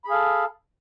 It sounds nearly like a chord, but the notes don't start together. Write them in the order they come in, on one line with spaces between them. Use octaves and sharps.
B5 G#4 F5 A4